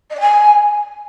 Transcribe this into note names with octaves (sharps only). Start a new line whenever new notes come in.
D#5
D5
G#5